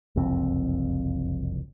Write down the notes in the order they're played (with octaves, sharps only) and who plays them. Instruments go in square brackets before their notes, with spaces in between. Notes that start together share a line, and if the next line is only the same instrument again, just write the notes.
[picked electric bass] F#1 C2 F2 C4